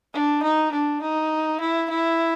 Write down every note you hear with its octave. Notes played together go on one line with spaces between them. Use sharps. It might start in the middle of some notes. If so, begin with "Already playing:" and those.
D4
D#4
D4
D#4
E4
E4